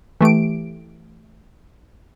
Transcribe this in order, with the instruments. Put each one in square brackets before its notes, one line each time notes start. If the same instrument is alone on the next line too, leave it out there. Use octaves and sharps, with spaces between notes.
[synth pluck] E3 A3 G4 D7